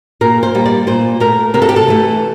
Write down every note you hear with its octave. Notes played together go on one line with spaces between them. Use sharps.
A#2 A#4
C5
G3 A#3
D5
A#2 C5
A3 A#4
C3 A#4
A4
G4
A4
E3 A3